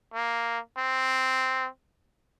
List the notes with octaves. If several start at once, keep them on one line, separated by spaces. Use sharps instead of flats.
A#3
C4